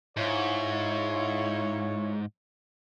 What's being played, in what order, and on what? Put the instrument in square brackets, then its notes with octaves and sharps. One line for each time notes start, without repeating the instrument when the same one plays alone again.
[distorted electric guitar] G#2 [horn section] E4 F4 C#5